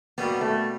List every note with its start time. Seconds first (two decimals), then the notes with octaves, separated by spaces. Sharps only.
0.18 B2 G3 A#3 B3
0.41 A3